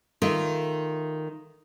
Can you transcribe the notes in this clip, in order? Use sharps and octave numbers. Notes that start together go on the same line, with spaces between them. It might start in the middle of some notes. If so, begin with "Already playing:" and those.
D#3 A3 F4